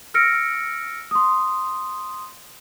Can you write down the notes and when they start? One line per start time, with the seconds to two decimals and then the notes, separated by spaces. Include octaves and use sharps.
0.14 E6 F6 A#6 C#7 D7
1.11 C6 D#6